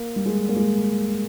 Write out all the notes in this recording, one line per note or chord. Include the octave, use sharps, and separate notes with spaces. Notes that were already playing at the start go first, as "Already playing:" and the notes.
Already playing: A#3
G3
G#3
A#3
G#3